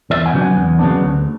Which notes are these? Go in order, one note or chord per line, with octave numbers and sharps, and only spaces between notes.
E2 D5 E5
F#5 G#5
C#3 F#3 B3 D4
F#5 G#5
E2
C#3 F#3 B3 D4
D2